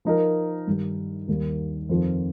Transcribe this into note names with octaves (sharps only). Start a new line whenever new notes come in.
F3 D#4 A#4
G2 D#3 G3
D#2 D#3 G3 A#3
F2 D#3 C4 F4